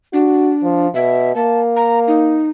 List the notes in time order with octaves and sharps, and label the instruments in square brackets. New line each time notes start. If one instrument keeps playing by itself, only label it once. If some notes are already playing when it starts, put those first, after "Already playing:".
[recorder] D4 [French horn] F#4
[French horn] F3
[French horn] B2 [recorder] E5
[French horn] A#3 [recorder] A5
[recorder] A#5
D#4